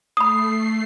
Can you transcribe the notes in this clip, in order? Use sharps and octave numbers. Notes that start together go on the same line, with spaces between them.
A3 B5 D#6 C7